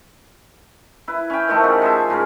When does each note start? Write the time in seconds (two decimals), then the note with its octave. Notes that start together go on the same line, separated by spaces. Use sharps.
1.08 E4 B4
1.30 C#4 G5
1.48 D#3 F3 A3 D#4
1.63 C#3 G4 A4 F#5
1.82 F3 G#4 C5 E5
2.09 G#2 C#3 C#4 A#4